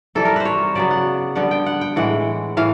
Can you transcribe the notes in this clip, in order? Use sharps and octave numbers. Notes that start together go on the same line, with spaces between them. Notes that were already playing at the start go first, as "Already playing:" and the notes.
C3 E3 G3 A4
A#4
B4 C5
C#5
C#3 F#3 B3 D5
F#5
D3 G3 B3 F#5
G5
F#5
G5
A2 E3 G#3 F#5
A2 E3 F5